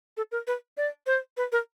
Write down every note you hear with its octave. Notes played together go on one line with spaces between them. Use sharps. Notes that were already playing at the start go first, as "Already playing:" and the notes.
A4
A#4
B4
D5
C5
B4
A#4